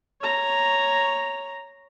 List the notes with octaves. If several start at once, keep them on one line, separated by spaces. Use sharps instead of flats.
C#5 A#5